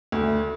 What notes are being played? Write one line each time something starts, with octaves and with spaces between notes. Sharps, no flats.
D2